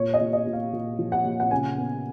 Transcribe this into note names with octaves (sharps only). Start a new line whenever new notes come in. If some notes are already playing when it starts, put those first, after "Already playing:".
Already playing: A#2 C#5
D#5
A#2
D#5
A#2
F5
A#2
F3
F#5
A#2
F#5
C#3 G#5
B3